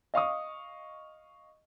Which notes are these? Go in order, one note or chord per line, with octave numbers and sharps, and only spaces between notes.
D#5 F5 C#6 D#6